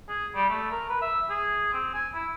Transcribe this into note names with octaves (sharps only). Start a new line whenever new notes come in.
G#4
G3
A3
A#4
B4
E5
G#4
C4
G#5
E4